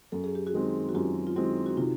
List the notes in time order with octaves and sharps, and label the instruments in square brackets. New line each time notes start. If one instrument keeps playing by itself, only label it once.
[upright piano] F#2 [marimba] A4
[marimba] G#4
G4
F#4 G#4
[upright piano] D#3 G#3 C4
[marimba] F#4
[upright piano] F#2 [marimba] F4 G4
[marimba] F4
[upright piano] D#3 G#3 C4 [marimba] E4 F#4
[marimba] F#4
[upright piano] C3 [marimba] D#4 F4